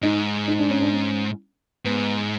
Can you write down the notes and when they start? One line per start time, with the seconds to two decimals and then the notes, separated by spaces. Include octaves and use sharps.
0.02 G#2 D#4
0.48 D#4
0.59 D4
0.70 C#4
0.82 D4
0.93 C#4
1.85 G#2 B3